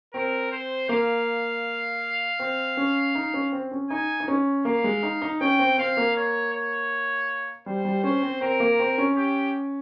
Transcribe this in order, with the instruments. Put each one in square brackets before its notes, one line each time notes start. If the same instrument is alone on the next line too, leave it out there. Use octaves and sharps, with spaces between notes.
[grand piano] C4 [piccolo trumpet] A#4
[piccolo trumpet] C5
[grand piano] A#3 [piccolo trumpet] F5
[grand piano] C4
C#4
D#4
C#4
C4
C#4
[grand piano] D#4 [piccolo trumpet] G#5
[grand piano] D#4
C#4
[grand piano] A#3 [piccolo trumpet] F5
[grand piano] G#3
D#4
D#4
[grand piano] C#4 [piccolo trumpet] G5
[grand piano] C4
[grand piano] C4 [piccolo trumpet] F5
[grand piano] A#3
[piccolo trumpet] C#5
C#5
[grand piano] G3 [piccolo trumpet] C5
[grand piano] G3
[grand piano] C#4 [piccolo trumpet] C5
[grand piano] C4
[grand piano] C4 [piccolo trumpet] A#4
[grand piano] A#3
C4
C#4
[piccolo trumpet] G4